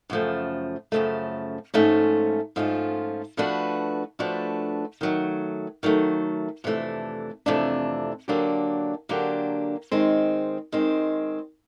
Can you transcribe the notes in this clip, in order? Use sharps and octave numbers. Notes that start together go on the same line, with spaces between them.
F#2 C#3 F3 A3
F#2 C#3 F3 A3
G#2 F3 A3 C#4 F4
G#2 F3 A3 C#4 F4
F3 A3 D4 F#4 B4
F3 A3 D4 F#4 B4
D#3 F#3 A3
D#3 F#3 A3
F2 C3 E3 A3 D4
F2 C3 E3 A3 D4
D3 F#3 A#3 D4 G4
D3 F#3 A#3 D4 G4
D#3 G#3 C4
D#3 G#3 C4